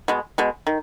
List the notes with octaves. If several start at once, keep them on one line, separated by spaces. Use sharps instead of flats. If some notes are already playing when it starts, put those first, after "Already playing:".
B2 G#3
B2 G#3
D#3